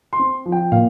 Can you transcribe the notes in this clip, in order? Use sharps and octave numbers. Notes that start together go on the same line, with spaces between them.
C6
C4
F3
G5
A#2 F5